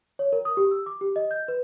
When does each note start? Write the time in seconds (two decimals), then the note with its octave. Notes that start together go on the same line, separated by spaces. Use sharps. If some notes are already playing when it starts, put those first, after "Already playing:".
0.19 C#5
0.33 A#4
0.45 D#6
0.57 G4
0.71 E6
0.86 D6
1.01 G4
1.16 D#5
1.31 G6
1.48 B4